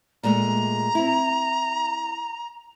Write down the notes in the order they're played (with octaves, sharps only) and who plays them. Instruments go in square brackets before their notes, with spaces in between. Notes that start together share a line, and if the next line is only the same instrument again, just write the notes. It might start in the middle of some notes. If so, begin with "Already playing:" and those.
[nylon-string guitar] A#2 G#3 A3 [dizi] A#5
[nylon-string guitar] C4 E4